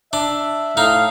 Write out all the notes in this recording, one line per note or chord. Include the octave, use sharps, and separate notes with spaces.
D4 E5
A2 D#4 F5